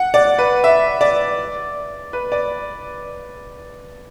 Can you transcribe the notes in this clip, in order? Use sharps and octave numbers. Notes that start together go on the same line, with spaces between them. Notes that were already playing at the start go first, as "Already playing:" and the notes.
Already playing: F#5
D5
B4
E5
D5
B4
D5